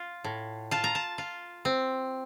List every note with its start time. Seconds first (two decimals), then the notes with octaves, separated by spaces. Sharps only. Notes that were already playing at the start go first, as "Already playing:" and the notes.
Already playing: F4
0.24 A2
0.71 F4 A5
0.84 A#5
0.95 A5
1.18 F4
1.65 C4